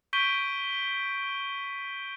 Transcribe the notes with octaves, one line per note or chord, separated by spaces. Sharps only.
C#6 G6 B6 D7 D#7 G7